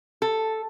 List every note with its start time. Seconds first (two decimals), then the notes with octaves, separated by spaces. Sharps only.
0.22 A4